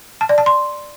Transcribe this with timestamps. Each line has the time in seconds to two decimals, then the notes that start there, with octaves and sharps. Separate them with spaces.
0.21 A5
0.29 D5
0.38 A5
0.46 C6